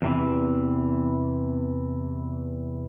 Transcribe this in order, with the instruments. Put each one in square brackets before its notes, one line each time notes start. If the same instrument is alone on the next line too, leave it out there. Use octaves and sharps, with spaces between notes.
[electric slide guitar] E2 C3 E3